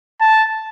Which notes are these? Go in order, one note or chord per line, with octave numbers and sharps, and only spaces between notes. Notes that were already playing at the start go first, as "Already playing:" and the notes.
A5